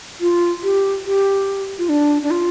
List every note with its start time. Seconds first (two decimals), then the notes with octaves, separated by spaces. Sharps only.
0.21 F4
0.63 G4
1.05 G4
1.78 F4
1.89 D4
2.23 D4
2.31 F4